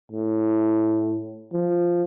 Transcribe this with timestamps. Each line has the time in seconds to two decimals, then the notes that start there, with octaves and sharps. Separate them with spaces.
0.12 A2
1.53 F3